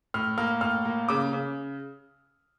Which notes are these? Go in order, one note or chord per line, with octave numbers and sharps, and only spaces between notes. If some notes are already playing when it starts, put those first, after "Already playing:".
A2 F6
A#3 F6
A2 F6
A#3
C#3 D6
C#3